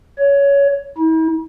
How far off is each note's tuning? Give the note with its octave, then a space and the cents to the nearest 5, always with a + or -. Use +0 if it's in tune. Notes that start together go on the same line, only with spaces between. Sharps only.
C#5 +15
E4 -45